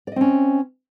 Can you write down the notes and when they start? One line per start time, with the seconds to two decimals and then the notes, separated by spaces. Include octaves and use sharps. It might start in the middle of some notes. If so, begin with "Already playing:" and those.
0.07 D5
0.12 D#5
0.16 C4
0.21 C#4